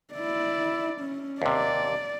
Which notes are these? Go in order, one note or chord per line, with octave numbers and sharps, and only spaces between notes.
E4 D5
C#4
D#2 C3 D5